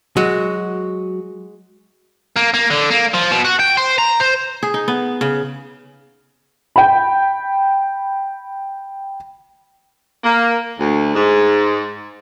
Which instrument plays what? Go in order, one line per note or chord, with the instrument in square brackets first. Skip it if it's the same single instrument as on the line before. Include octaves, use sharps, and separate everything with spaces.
[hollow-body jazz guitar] F#3 [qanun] G#3 F#4
[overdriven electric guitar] A#3
A#3
D3
A#3
F3
B2
F#4
G5
C5
A#5
C5
[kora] G#4
D#4
B3
C#3
[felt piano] G5 B5
[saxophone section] A#3
D2
G#2